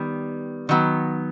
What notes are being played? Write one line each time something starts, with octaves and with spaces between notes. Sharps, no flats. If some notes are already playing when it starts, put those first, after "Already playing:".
Already playing: D#3 G3 B3
D#3 F#3 B3